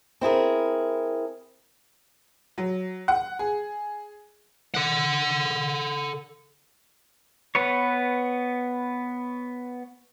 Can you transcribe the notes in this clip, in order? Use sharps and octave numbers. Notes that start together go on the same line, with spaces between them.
C4 E4 G#4 A#4
F#3
F#5
G#4
A4 F#5
B3 B4 C#5